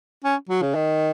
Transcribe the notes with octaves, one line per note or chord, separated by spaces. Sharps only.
C#4
F#3
C#3
D#3